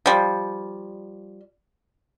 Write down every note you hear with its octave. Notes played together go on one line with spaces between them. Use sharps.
F3 G3